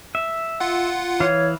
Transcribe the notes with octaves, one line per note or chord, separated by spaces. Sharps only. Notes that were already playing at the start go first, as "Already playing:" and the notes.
E5
F4 F#5
E3 C#5 F5